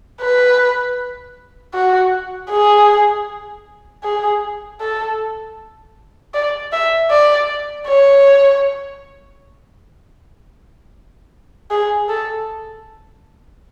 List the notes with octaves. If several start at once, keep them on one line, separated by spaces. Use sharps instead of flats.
B4
F#4
G#4
G#4
A4
D5
E5
D5
C#5
G#4
A4